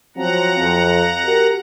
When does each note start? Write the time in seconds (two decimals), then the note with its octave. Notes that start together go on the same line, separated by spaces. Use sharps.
0.16 F3 F#3 C4 F#5 A#5
0.59 F2
1.24 F#4 G4 A#4